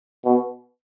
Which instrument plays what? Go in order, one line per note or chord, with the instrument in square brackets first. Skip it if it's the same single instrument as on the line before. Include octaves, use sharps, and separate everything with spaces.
[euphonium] B2